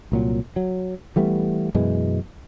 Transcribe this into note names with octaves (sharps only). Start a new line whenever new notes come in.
C2 A#2 F#3
F#3
E3 G3 A3 B3
F#2 B2 E3 G#3